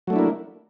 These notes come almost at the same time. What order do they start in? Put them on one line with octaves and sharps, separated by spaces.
F#3 A3 D4 E4 A#3